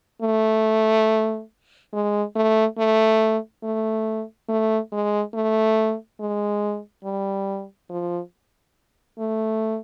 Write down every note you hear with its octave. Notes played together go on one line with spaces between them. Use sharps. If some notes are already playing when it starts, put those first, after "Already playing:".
A3
G#3
A3
A3
A3
A3
G#3
A3
G#3
G3
F3
A3